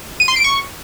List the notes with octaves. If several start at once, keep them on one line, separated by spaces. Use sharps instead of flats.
D#7
C6
D7
C#6